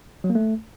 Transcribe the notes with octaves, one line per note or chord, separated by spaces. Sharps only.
F#3
A#3
A3